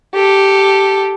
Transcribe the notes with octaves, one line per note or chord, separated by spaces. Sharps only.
G4 A4